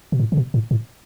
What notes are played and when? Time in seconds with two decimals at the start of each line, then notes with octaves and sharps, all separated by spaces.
0.12 B2
0.20 A2
0.32 C#3
0.37 B2
0.54 A2
0.71 A2